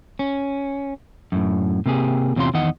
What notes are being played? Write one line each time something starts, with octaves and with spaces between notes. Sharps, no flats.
C#4
F#2 A2
C3 A#3 G4 G#4
E2 C3 C#4 F4 C6
E2 D#3 D#5 F#5